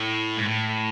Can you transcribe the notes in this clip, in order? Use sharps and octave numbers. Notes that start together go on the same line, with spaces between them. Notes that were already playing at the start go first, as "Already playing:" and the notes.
Already playing: A2
G#2
A2